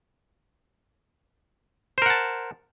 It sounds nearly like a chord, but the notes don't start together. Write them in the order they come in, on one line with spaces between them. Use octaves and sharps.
C5 A#4 F#5 A5